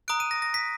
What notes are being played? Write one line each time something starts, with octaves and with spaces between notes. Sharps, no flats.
A#5 D#6 F#6 D7
D#7
A#6
A#6
B6